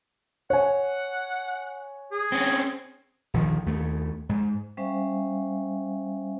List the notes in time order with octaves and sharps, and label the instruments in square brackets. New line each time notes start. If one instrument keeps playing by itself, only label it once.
[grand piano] C#5 G#5 [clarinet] F#5
[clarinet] G#4
[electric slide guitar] C4 C#4
[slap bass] A#1 D#2 D3 D#3
D#2 A3
G#2
[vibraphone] G3 C#4 C5 E5 F5 G#5